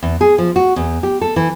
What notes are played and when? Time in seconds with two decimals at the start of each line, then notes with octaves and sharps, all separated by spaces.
0.03 E2
0.21 G#4
0.38 F3
0.56 F#4
0.76 E2
1.03 G4
1.21 A4
1.36 E3